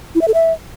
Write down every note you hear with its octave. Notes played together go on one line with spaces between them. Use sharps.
E4
E5
A4
E5